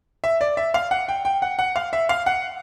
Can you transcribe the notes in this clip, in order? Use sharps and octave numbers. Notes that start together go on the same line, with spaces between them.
E5
D5
E5
F5
F#5
G5
G5
F#5
F#5
F5
E5
F5
F#5